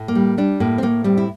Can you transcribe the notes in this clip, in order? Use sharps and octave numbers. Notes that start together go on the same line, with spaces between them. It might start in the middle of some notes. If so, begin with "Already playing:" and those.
Already playing: A2
A#3
G3
G3 D4
A2 A#3
C4
A2 A#3
G3 C4
E4